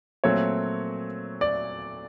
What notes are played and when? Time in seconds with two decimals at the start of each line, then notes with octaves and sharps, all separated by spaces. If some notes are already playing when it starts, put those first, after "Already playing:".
0.24 A#2 F#3 A3 C4 C#5
1.41 D5